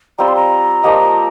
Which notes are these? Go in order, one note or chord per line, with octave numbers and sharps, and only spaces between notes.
G3 C4 F4 A#5
C6
A#5
F3 A#3 G4 D#5